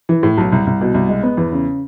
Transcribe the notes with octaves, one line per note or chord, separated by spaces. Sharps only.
E3
A2
B1
C2
C2
B2
C2
G#3
B3
E2
C#3